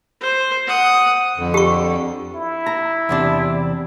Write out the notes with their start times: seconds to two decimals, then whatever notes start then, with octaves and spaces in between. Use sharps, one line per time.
0.20 C5
0.67 F#5 D#6
1.37 F2 D3
1.54 G4 C#6
2.35 E4
2.66 A#5
3.09 E2 C3 D4